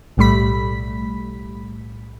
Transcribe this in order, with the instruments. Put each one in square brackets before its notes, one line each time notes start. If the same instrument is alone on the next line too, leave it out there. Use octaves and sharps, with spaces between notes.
[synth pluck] B1 A2 G3 A3 B5 B6